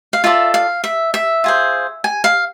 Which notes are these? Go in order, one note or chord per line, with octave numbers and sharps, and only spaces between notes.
F5
F4 A4 D5 E5
F5
E5
E5
F4 G#4 C5
G#5
F5